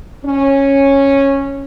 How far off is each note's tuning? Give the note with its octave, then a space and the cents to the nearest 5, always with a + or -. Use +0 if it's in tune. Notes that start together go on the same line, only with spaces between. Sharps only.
C#4 -10